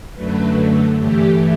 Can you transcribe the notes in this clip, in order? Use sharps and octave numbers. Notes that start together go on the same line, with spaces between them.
F#2 D3 F#3 A3 B4
G2 E3 A3 G4